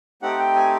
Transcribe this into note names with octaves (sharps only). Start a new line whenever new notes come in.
A3 C4 D#4 G4 F#5
G5
G#5